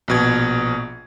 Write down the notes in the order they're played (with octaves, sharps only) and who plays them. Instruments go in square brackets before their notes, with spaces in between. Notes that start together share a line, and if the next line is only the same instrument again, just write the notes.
[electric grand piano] A#1 B2 G#6